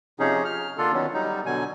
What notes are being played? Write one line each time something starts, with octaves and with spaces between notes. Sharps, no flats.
C3 F3 C#4 D#4 G#4
F6
D3 A#3 D4 F4 A4
D#3 F#3 B3 C#4
F#3 G3 D#4
B2 D3 F#3 G#5